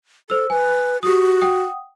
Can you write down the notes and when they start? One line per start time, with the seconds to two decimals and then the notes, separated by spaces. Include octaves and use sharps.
0.30 A4 C5 E6
0.50 B4 G#5
1.03 F#4 G4 D#6
1.41 F#5 G5 D#6